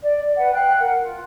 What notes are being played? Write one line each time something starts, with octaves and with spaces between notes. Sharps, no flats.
D5
D5
B4 F#5
F5 G5 F#6
A#4 F#5
F4